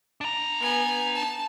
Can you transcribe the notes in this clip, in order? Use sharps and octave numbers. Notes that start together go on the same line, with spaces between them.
D4 A#5
B3 G#5
A5